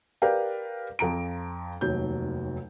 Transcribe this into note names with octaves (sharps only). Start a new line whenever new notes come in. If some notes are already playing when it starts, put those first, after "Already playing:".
G4 A#4 B4 D5 F5 G5
F2 F3 A#5 D7
F1 D#2 F#3 G6